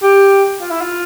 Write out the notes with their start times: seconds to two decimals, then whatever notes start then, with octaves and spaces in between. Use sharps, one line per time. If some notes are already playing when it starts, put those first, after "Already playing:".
0.03 G4
0.61 F4
0.71 E4
0.81 F4